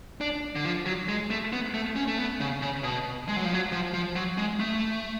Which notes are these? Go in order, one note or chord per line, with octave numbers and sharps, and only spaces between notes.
D4
D3
F3
F#3
G#3
A3
B3
A3
C#4
A3
B3
C#3
C#3
B2
G#3
F#3
F3
F#3
F3
F3
F#3
G#3
A3